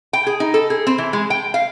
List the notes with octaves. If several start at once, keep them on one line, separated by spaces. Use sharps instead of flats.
G5
G#4
D#4
A4
G#4
C4
E3
G#3
G5
F5